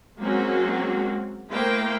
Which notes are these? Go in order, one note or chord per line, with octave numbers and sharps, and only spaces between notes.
F#3 G#3 A#3 C4 C#4 F#4
A3 A#3 E4 C5 F5 G5